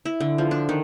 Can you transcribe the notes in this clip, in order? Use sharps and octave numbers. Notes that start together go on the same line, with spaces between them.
E4
D3
F3
D4
D#3